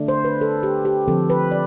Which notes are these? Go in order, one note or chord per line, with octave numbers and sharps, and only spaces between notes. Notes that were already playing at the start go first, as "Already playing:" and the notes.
Already playing: D3 A3 D4
C5
B4
A4
G4
G4
D3 F3 C4 A4
B4
D5